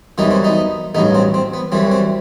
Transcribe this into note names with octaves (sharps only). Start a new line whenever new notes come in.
F#2 E3 G3 B3 D#4
C4
B3 D#4
A1 G2 F#3 B3 D#4
C4
C4
B3
F#2 E3 G3 C4
C4